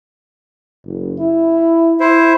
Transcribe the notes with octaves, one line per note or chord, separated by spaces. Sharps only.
F#1
E4
E4 C5